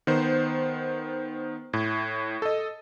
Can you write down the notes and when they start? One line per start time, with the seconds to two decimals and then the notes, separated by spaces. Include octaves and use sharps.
0.07 D#3 B3 C5
1.73 A2
2.42 A4 D#5